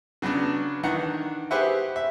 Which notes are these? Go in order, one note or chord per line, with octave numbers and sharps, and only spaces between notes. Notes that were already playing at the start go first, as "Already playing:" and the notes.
C#3 F#3 B3 D4
D#3 E3 D4 F#5 A#5
G4 G#4 B4 C5 E5 F#5
E5